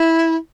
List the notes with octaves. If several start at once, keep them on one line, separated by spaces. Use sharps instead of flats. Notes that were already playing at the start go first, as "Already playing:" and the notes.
Already playing: E4